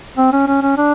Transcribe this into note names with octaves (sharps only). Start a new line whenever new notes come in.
C4
C#4
C#4
C#4
D4